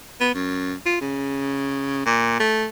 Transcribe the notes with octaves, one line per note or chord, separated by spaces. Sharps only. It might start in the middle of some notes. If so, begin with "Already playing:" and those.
B3
F#2
F4
C#3
A#2
A3